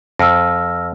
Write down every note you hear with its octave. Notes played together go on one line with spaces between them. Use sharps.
F2 E6 F6 A#6